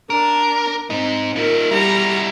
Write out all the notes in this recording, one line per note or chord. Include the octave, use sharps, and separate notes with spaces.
D4 A#4
G#2 C4 D#4
D#4 F4 A#4
G3 E4 F#4 A#5